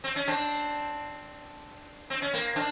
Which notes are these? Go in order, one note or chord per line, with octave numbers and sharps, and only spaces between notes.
C4
C#4
C4 D4
C4
C#4
A#3 C4
C4 D4